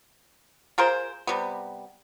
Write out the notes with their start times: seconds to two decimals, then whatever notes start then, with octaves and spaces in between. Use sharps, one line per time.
0.78 F4 G#4 A#4 C5
1.27 C3 G3 B3